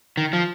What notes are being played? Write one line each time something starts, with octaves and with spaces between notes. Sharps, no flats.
D#3
F3